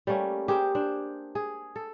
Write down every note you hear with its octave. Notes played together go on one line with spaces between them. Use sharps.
G3 A3 A#3 C#4
G4 G#4 A#4 C5
D4 C5
G#4
A4